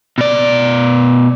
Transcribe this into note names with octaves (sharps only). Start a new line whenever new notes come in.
B2 D5